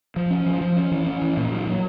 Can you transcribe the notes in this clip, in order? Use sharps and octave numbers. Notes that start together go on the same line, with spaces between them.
F3
C#4
F3
F3
C#4
E3
C#4
E3
A#2
F#3
F#3